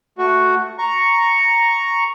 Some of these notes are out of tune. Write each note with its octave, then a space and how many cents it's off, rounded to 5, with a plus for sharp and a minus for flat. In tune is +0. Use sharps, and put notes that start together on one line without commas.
A3 +0 F#4 +0
A#5 +0 C#6 +0